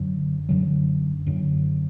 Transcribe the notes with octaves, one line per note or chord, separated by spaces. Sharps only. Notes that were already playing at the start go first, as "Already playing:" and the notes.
Already playing: F#2 D3 F#3
F#2 D3 F#3
F#2 D3 F#3